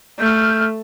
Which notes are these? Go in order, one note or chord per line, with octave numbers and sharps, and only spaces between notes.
A3 F6 G6